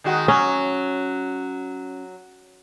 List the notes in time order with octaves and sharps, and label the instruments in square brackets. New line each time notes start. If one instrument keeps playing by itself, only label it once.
[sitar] D#3 G#3 F#4
[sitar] F#3 [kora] C#4